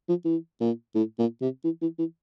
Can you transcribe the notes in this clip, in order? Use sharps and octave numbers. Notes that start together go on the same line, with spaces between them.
F3
E3
A#2
A2
A#2
C3
E3
E3
E3